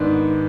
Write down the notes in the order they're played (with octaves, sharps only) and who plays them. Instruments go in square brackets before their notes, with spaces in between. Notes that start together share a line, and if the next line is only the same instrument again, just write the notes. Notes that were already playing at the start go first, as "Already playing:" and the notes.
Already playing: [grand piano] G#2 D#3 B3 D4